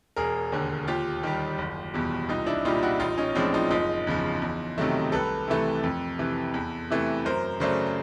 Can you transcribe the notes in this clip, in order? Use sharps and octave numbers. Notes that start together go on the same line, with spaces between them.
E1 G#4 A#4
D#2 D3
D#2 F4 G4
D#3 G3
F#1
E2 B2 G3
C2 D#4 F4
D4 E4
A#2 G3 D#4 F4
E4 F#4
A1 D#4 F4
C#4 D#4
A2 F3 G#3 C4 D4
D#4 F4
F#1 D#4 F4
E2 C#3 F3
E2
C3 D#3 F#3 A3
C2 A4 B4
C3 E3 A3
F2
C3 E3
E2
C3 E3 A3
F#2 A#4 C5
C#3 F#3 A3 C5 D5